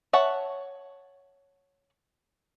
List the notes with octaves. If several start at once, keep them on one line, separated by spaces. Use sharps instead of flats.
C#5 E5 F#5 A5